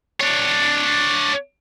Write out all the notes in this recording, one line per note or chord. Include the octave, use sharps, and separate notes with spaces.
D4 C#5